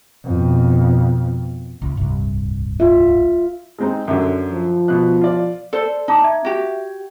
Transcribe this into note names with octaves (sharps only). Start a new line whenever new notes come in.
F2 B2
C#2
D1 C2 G2
F4 E5
G#3 C4 D#4
F#2 D3
F3
B2 F#6
F4 D5
A4 C5 D5
D#4 A5 D6
E5 G#6
F#4 G4